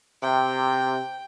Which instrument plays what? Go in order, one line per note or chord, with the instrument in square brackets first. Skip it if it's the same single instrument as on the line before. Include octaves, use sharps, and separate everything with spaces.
[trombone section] C3 [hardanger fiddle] G5